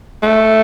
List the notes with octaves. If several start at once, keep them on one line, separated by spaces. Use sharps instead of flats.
A3